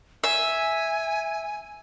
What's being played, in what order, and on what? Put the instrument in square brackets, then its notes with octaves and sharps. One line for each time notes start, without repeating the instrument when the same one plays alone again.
[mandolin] E5 [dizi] G#5